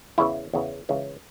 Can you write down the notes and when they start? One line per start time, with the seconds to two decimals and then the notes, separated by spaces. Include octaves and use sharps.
0.18 E2 C#3 E3 E4
0.53 E2 C#3 E3
0.89 C#2 C#3 E3